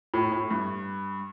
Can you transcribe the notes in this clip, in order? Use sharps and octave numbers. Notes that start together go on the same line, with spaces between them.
A2
A2
G2